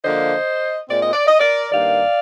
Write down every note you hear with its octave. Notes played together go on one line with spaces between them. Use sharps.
D3 F3 A#3 C5 D#5
A#2 G#3 C4 D5
D#5
D5
D#5
A#4 D5
G2 D#3 A#3 D5 F5